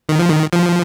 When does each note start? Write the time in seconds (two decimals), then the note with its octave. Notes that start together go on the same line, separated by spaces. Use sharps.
0.09 D#3
0.19 F3
0.30 D#3
0.53 F3